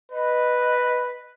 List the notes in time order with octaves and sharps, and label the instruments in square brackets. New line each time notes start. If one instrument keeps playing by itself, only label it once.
[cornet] B4 [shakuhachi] D#5